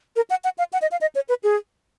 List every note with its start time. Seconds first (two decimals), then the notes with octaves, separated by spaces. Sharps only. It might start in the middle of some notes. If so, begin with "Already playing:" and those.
0.16 A#4
0.30 F#5
0.44 F#5
0.58 F5
0.73 F#5
0.82 D#5
0.91 F5
1.01 D#5
1.15 C#5
1.29 B4
1.43 G#4